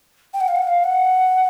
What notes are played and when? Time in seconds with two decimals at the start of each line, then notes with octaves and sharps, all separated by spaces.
0.34 G5
0.41 F#5
0.48 F5
0.56 F#5
0.67 F5
0.84 F#5